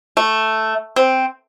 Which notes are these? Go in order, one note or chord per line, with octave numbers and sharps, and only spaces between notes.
A3
C4